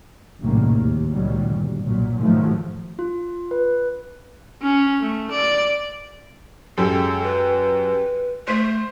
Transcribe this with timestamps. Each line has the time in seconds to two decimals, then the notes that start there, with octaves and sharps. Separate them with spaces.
0.41 A#1 F#2 A2 C3 D#3 A#3
0.75 D#2
1.13 C#2 A#2 D#3 F#3 G3
1.52 G1
1.84 B1 A#2 F#3
2.20 G#2 D#3 F3 F#3 A3
2.99 F4
3.51 B4
4.63 C#4
5.01 A3
5.31 D5
6.78 F#2 G#3 G4 A4
7.23 B4
8.48 A3 C5